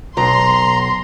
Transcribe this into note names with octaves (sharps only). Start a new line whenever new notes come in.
B1 A#5 C6